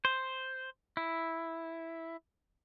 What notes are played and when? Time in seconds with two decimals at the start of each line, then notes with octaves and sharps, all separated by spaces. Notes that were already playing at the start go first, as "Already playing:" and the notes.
0.05 C5
0.97 E4